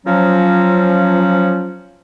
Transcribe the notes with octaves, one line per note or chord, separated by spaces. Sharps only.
F3 F#3 C#4